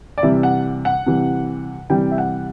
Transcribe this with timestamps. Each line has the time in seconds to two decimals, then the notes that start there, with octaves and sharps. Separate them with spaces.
0.18 D5
0.23 C3 E3 G3 E5
0.43 F#5
0.85 F#5
1.06 C3 E3 G3
1.90 C3 E3 G3 G5
2.12 E5
2.18 F#5